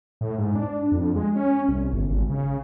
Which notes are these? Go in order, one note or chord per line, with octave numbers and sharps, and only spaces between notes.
A2
G#2
D4
F2
G#3
C#4
C2
G1
G#1
C#3